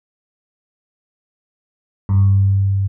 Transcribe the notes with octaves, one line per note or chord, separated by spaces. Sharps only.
G2